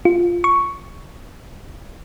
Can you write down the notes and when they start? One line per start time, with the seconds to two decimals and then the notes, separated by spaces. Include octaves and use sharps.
0.05 F4
0.44 C#6